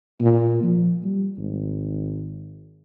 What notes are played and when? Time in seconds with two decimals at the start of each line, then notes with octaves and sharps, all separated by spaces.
0.21 A#2
0.63 F3
1.04 G3
1.38 G#1